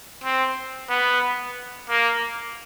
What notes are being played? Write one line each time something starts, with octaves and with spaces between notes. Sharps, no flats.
C4
B3
A#3